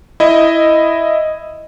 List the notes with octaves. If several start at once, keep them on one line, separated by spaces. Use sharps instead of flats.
E4 D#5